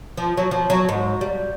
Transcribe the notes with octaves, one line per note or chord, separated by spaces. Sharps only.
F3
F#3
F3
F#3
G#2
G3